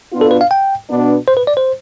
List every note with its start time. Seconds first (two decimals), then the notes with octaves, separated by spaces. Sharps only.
0.12 B2 B3 D4 F4
0.21 A4
0.31 B4
0.41 F5
0.51 G5
0.89 B2 B3 D4
1.28 C5
1.37 B4
1.47 D5
1.57 C5